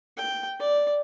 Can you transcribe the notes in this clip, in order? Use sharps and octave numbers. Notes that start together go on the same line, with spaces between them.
G5
D5